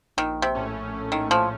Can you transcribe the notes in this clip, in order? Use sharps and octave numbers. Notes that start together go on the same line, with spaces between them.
A#1 D#3
C3
A2 A3 C#4
A#1
D#3
A2 F3 A3 C#4